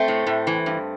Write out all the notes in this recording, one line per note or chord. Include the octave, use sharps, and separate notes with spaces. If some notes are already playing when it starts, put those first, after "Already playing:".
Already playing: A3 C4
A2
A2
E3
G2